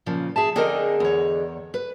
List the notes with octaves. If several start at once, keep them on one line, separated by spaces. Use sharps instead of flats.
A#2 C#3 F3
G#4 E5 A5
D3 C4 D#4 G#4 A#4 D#5
E2 C#5
B4